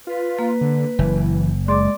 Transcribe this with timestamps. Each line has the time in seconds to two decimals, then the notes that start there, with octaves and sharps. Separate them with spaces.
0.07 F4 B4
0.39 A#3
0.61 D3
0.99 F#1 E3
1.68 G#3 D5 C6 D6